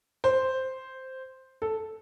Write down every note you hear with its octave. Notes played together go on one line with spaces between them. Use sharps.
C5
A4